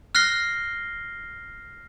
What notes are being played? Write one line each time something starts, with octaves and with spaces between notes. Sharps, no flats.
F6 F#6 A#6 C7 G7